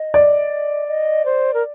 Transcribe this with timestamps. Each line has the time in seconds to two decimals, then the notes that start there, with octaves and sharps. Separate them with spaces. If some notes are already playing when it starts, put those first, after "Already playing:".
Already playing: D#5
0.14 D5
0.88 D#5
1.25 C5
1.54 A#4